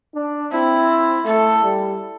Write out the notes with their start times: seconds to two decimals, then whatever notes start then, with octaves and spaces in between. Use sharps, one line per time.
0.15 D4
0.52 C4 E4
1.26 A3 A4
1.64 G3